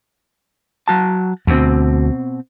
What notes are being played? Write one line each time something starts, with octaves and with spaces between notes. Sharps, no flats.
F#3 F#4 A5
D2 B2 C4